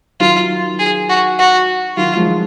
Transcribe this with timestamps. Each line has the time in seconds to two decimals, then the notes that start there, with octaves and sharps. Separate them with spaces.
0.20 D#3 F#3 F4
0.79 G#4
1.09 F#4
1.39 F#4
1.97 D#3 F#3 F4
2.17 F3 G#3